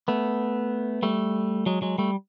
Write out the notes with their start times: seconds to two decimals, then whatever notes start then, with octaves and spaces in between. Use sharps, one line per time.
0.08 A3 B3
1.03 G3 A3
1.66 F#3 G#3
1.82 F#3 G#3
1.98 G3 A3